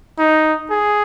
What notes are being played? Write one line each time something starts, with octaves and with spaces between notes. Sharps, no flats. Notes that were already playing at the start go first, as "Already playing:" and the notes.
D#4
G#4